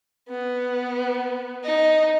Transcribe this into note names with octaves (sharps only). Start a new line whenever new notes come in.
B3
D#4